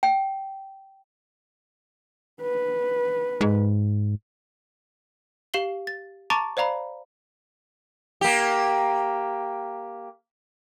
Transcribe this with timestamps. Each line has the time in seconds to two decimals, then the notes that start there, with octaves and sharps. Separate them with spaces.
0.03 G5
2.42 B4
3.41 G#2
5.54 G4 F5 C7 F#7 G7
5.87 A6
6.30 A5 A#5 C#6 D6 A6 D7
6.57 C5 D5 F5 A#5 B5
8.21 A#3 G4